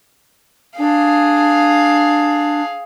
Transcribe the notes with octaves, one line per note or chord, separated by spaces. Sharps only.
D4 G#4 F5